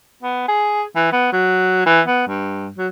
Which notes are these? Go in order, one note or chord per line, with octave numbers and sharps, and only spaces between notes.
B3
G#4
E3
B3
F#3
E3
B3
G2
F#3